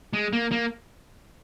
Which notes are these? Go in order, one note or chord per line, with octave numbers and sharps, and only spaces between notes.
G#3
A#3
A#3